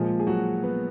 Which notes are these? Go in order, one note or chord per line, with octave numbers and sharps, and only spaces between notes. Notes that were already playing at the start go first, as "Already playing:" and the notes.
Already playing: A#2 F3 G#3 G#4
G#4
F#3 F#4
B3